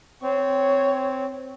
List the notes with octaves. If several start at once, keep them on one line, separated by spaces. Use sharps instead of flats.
C4 C#5